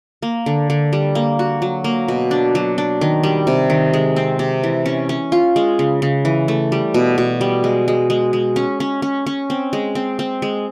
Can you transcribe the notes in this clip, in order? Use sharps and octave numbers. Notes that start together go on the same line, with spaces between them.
A#3
D3
D3
G3
A#3
F#4
F#3
A#3
B2
D4
F#3
D4
D#3
G3
C3
D#3
G#3
C4
C3
E3
C#4
C#4
F4
G#3
C#3
C#3
E3
A3
G3
B2
B2
G3
G#3
G#3
G#3
G#3
C#4
C#4
C#4
C#4
C4
G#3
C4
C4
G#3